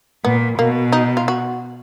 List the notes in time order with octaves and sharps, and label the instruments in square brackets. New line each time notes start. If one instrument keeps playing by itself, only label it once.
[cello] A#2 [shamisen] B3
[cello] B2 [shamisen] A#3
[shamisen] D#4
F4
F#4